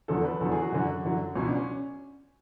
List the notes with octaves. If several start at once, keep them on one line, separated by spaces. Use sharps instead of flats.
E2 D3 F#3 A4
A4
B4
E2 D3 F#3 A4
G#4
F#4
F#2 D3 F#3
F#2 D3 F#3
C#2 B2 F#3 C#4
D4
C#4